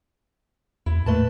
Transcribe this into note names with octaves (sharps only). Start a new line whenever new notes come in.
E2 E4
A2 A3 B4 A5